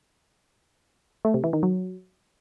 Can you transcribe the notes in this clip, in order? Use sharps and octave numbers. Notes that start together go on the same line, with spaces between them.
A3
C3
E3
D#3
F#3